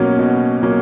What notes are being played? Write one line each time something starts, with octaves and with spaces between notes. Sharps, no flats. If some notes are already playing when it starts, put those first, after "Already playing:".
Already playing: B2 F#3 A#3 C#4
B2
F#3 A#3 C#4